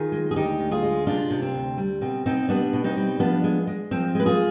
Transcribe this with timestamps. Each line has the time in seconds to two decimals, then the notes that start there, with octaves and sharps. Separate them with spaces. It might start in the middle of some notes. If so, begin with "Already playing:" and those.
Already playing: D#3 F4 G#4
0.12 G#3
0.31 G#4
0.36 D2 D#4 G4
0.59 D2
0.71 F4 G#4
0.83 G#3
1.07 C3 D4 F4
1.31 C3
1.42 C4
1.55 D2
1.78 G3
2.01 B2 C4
2.26 B2 C4 D#4
2.49 G3 B3 D4
2.73 B2
2.84 C4 D#4
2.96 G3
3.19 F3 B3 D4
3.44 G#3
3.67 G#3
3.91 F3 C4
4.15 G#3 B4
4.26 F4 G#4